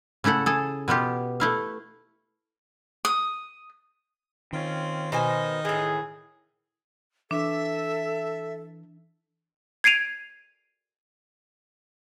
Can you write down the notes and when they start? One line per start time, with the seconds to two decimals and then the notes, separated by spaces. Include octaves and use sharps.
0.24 C#3 A3 E4 A4 F#5
0.46 G#4 A4
0.88 B2 B3 F4 G4
1.40 A3 E4 F5
3.05 D#6
4.53 D#3 C4 C#4 F4
5.12 B2 D#4 A#4 C5 D#5 G#5
5.65 A2 E3 G#4
7.31 E3 D4 A4 E5
9.84 G#6 C7 D7 D#7 F7